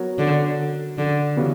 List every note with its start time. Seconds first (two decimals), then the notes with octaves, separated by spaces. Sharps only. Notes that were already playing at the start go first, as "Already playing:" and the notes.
Already playing: F#3 B3 F#4 A#4 C#5
0.18 D3
0.98 D3
1.36 C#3 E3 G3 B3 F#4